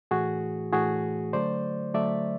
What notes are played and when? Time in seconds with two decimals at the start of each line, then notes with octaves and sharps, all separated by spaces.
0.11 A2 E3 A3 F#4 G#4
0.72 A2 E3 A3 F#4 G#4
1.33 D3 F#3 A3 C5 D5
1.94 D3 F#3 A3 D5 E5